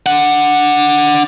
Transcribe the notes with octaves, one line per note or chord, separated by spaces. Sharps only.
D4 F#5